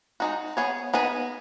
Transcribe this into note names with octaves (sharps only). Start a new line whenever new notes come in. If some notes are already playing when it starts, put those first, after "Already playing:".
G#3 D#4 F#4
B3 G#4 C#5
D#3 B3 G#4 B4 D#5